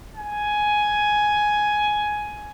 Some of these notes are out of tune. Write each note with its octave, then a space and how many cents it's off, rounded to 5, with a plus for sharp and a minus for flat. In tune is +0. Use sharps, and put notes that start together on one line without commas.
G#5 +10